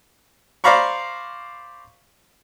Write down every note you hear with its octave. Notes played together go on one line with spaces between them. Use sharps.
C5 D5 F5 A#5 B5 C#6